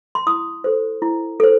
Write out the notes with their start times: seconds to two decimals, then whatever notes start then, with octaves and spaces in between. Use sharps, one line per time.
0.15 C6
0.27 E4 D#6
0.64 A4 C5
1.02 E4
1.40 A4 C5